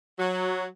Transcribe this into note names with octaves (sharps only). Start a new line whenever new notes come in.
F#3